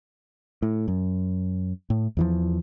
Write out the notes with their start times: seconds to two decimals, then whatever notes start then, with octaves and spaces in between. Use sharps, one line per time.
0.62 A2
0.88 F#2
1.90 A2
2.17 E2 E3 F3